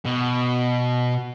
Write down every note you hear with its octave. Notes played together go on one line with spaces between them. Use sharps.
B2